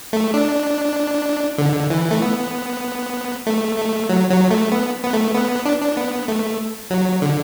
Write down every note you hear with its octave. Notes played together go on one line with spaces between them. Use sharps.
A3
D4
D3
E3
A3
B3
A3
A3
F#3
F#3
A3
B3
B3
A3
B3
D4
D4
B3
A3
F#3
D3